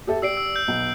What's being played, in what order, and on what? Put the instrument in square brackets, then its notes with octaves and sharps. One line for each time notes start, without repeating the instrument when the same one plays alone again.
[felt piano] G4 A4 E5
[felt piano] G4 D5 [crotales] E6 C7 D7
[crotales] E6
G6
[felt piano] B1